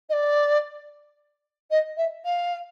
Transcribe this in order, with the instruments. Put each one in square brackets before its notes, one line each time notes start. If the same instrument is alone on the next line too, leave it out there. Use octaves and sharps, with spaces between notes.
[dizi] D#5
D5
D#5
E5
F5